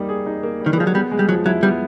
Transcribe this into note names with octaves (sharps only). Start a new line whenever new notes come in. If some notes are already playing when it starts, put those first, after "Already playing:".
Already playing: G3 A#3 D#4
G#4
D#4
A#3
G3
D#3
E3
F3 G#4
F#3
G3 B3
G#3
G3
F3 F#3
F#3 E4
G3 B3